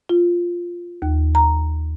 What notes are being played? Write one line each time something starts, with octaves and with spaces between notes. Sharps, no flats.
F4
D#2
A#5